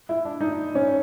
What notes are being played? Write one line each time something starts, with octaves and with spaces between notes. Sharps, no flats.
E4
D4
D#4
C#4